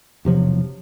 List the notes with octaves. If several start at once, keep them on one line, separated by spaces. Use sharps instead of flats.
E1 C3 F3 F#3